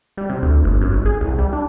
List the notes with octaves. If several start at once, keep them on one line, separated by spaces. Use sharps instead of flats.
G3
C3
D2
G1
F#2
G#1
G#4
C2
G3
D4